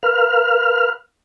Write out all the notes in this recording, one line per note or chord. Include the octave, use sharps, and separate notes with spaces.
A#4 B4 F5 F6